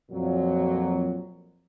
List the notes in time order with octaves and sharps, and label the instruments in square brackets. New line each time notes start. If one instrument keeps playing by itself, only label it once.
[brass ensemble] F2 A#2 F#3